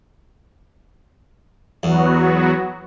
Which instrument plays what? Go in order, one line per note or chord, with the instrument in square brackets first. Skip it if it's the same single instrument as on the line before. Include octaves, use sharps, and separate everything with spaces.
[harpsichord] E2 [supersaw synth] F#3 B3 F#4